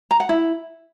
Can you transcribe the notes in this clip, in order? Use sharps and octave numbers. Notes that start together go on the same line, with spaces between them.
A#5
F#5
E4